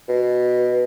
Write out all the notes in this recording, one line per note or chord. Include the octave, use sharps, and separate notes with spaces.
B2